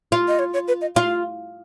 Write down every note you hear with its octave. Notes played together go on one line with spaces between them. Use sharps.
F4
D#5
C#5
C#5
B4
D#5
F4 F5